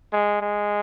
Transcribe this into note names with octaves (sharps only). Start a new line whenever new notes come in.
G#3
G#3